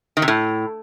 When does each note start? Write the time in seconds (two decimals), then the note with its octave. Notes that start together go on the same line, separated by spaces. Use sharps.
0.17 D#3
0.22 C3
0.28 A2